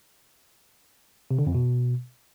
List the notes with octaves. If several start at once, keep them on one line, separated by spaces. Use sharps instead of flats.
C3
D3
F2
B2